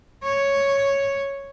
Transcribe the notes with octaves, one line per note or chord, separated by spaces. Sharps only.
C#5